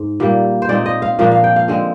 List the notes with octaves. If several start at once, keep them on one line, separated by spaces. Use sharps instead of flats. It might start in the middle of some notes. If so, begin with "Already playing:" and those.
Already playing: G#2
A#2 G3 A#3
C5
A#2 G#3 C4 D#4 D5
D#5
F5
A#2 F3 A#3 D4 F5
F5
G5
F5
D3 G#3 C4